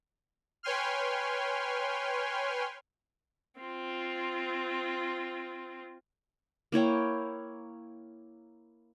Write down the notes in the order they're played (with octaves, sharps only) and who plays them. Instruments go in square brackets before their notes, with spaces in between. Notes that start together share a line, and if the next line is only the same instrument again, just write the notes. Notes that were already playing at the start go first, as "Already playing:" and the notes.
[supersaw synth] B4 C#5 G5 G#5 C6 F6
[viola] C4 F4
[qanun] A#3 E4 C#5 G5